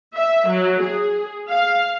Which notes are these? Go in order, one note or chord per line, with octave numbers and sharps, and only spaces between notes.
E5
F#3
G#4
F5